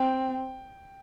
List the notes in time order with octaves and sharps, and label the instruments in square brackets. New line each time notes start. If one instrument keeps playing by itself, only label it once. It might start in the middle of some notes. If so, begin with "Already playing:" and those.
Already playing: [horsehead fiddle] C4 [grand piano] G5